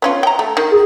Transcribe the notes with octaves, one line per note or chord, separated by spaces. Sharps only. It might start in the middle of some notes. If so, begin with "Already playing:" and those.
B3 C#4 F4
G5 A#5
A3
D#3
G#4